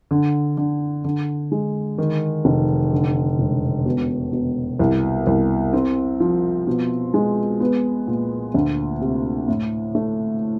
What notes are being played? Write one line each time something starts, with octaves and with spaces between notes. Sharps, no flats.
D3
D3
D3
G#3
D#3
F1
D3
E1
B2
B2
C2
C2
C4
F3
B2
G#3
B3
A#2
D2
C3
A2
A3